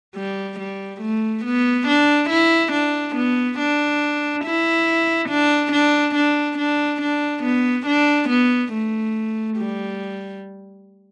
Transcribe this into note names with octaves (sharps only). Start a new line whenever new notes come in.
G3
G3
A3
B3
D4
E4
D4
B3
D4
E4
D4
D4
D4
D4
D4
B3
D4
B3
A3
G3